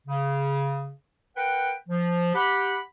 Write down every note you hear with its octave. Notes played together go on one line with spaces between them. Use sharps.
C#3
A#4 B4 F#5 G5
F3
G4 F#5 B5